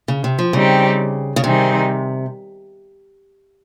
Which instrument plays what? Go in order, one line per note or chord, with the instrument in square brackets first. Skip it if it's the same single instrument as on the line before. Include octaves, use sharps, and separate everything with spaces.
[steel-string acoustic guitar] C#3
C3
F3
[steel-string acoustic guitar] C#3 [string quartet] G3 C4 D#4 G4
[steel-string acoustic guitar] C#3
[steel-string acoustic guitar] C3 [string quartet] D#3 G3 C4 D#4 G#4